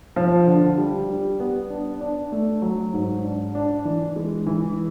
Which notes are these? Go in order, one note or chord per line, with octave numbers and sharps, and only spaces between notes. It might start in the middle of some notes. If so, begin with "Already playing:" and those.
F3
D3
G3
G3
B3
D4
D4
A3
F#3
G#2
D4
D4
E3
G#3
E3